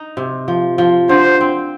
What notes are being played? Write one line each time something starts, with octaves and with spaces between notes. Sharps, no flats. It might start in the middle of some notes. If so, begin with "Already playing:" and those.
Already playing: D#4
C3
F3
F3
D3 C5
C4